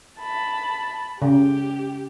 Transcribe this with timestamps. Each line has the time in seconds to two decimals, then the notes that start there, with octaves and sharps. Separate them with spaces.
0.21 A5 B5
1.22 C#3 G4